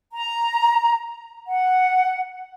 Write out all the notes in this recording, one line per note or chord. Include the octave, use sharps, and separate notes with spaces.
A#5
F#5